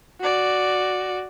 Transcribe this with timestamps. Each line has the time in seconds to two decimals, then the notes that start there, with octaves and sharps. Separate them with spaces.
0.21 F#4 D5